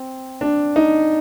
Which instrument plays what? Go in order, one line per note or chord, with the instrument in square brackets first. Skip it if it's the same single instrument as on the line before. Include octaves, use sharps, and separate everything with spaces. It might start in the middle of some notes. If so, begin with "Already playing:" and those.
Already playing: [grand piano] C4
D4
D#4